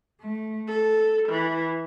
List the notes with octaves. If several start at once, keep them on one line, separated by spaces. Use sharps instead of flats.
A3
A4
E3